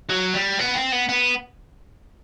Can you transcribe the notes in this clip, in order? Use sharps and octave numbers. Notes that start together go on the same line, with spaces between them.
F#3
G3
B3
C4
B3
B3